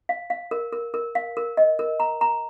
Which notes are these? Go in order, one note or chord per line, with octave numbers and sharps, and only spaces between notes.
F5
F5
A#4
A#4
A#4
F5
A#4
D#5
A#4
A#5
A#5